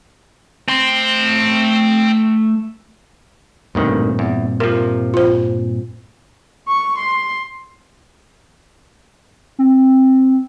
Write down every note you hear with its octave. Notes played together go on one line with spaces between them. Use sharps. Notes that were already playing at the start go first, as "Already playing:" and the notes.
A3 C4 C6
A1 D2 G2 A#2 D#3 C4
E2
C3 F3 A#4
F4 C5
C#6
C6
C4